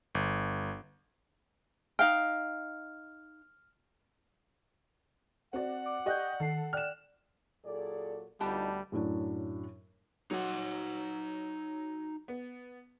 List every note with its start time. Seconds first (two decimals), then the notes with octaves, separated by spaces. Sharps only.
0.15 G1
1.99 D#4 F5 G5 F6
5.53 C4 F#4 D5 F#5
5.86 D6
6.06 G4 D5 D#5 C#6 F#6 G6
6.40 D#3 A4 C7
6.73 D5 G5 F6 F#6 E7
7.65 A#2 F#3 G#4 A4 D5
8.40 D2 G3 B3 D#4 F4 G4 D5 A5
8.92 F#2 A2 F#3 D4
10.31 F#3 D#4 F#5
12.28 B3